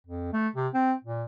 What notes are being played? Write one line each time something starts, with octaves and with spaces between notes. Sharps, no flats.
F2
A3
C3
C4
A#2